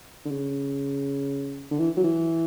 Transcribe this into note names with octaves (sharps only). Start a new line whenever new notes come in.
D3
C#3
D3
E3
F#3
E3